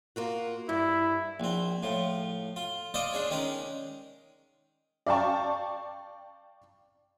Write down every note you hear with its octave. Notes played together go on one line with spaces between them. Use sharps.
A#3 F4 F#4
G2 E4
A#1 C4
A2 F3
F4
F4 C5 D5 D#5
D4 G#4 C#5
D#3 G#3 C#4 G#4 A#4
D5 F5 G5 A5 C#6